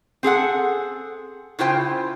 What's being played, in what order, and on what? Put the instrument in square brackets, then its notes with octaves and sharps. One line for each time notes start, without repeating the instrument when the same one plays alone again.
[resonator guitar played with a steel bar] C4 G#4 A4 F#5
C#3 E4 F4 C5 G5